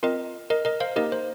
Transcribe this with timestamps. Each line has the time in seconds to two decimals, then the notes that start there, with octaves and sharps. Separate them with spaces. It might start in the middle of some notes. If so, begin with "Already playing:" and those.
0.03 C4 F4 A#4 D#5
0.50 A#4 D#5
0.65 A#4 D#5
0.80 C5 F5
0.96 A#3 D#4 G4 A#4 D#5
1.12 C5